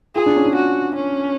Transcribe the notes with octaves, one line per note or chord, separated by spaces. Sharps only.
F4 G#4
D4
C#4
D4
F#4
C#4